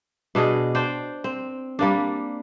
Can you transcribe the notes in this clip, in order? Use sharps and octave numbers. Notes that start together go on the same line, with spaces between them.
B2 D4 G#4 D#5
D4 C5 G5
C4
G3 A#3 D4